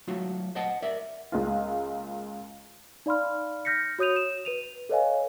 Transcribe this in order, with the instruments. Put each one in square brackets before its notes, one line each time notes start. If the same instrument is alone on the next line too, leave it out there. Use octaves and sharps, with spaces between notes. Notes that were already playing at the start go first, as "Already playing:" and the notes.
[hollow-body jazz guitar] F#3 A3 F4 F#4
C5 D#5 F#5 A5
A#4 D5 E5
[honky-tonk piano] C#2 G#3 A#3 F4
[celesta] D#4 D5 F5 B5 C6 F6
F6 G6 A#6 B6 C#7
F#4 C#5 D#6 G6 D#7 F7
E7
B4 D#7 F7
A4 B4 C#5 D#5 F5 G#5